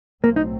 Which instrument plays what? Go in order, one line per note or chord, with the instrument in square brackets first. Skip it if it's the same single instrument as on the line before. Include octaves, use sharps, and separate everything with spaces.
[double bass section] B1 A2 F#3 A3 C4 [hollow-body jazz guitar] A#3
[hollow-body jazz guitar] D#4